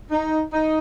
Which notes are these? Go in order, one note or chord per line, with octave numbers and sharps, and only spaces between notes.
D#4
D#4